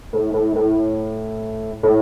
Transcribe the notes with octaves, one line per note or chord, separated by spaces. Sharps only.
A2
A2
A2
A2